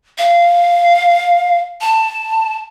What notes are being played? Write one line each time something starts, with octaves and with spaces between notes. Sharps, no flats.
F5
A5